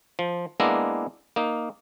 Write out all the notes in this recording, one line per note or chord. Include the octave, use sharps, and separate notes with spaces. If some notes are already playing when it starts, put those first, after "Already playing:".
F3
G#3 A#3 B3 D4 E4 A#5
A#3 D#4